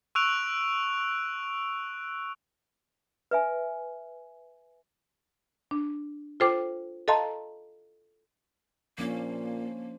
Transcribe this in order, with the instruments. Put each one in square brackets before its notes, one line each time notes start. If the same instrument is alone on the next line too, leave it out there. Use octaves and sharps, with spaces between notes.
[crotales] C#6 E6 F#6 D7 F7
[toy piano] B4 E5 G#5
[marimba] D4
F4 A4 C5 G5 D6
A4 D#5 F5 A5 A#5 C6
[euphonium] A#2 [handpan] F3 C#4 D4 [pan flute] A#3